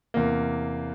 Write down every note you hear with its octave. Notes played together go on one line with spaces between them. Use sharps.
E2 C3 A#3